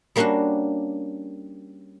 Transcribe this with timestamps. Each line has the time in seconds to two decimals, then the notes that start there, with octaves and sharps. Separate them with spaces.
0.16 G3 A#3 C#4 D4 F#4 F#5